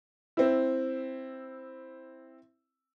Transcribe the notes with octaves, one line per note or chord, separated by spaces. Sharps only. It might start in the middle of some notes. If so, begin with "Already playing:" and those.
C4 E4